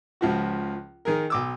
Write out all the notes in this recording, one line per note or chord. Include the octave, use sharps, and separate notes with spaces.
C#2 F3 F#4
D#3 G#4 A#4
B1 D6 E6